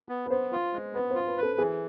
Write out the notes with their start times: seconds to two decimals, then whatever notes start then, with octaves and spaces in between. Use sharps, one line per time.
0.09 B3
0.26 B4
0.30 B3 C5
0.53 F4
0.73 G#3
0.94 B3 B4
1.11 C5
1.15 F4
1.27 B4
1.38 B4
1.43 A4
1.58 E3 G#4